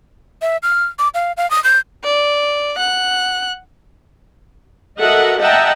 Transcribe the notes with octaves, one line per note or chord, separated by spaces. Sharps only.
E5
F6
D6
F5
F5
D#6
G6
D5
F#5 F#6
F#4 A4 A#4 D#5 E5 F#5
D#5 E5 F#5 G5 A5 A#5